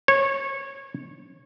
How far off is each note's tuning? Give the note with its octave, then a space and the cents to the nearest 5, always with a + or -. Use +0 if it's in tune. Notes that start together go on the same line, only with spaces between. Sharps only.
C#5 -20